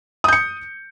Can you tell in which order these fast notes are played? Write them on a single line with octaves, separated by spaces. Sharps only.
D#6 G6 C#7